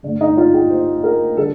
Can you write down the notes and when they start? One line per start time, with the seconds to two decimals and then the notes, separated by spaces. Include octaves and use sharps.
0.03 G2 D3 A3 D4
0.21 D#4
0.37 F4
0.54 G4
0.70 C5
1.03 A#4
1.37 D3 G3 A4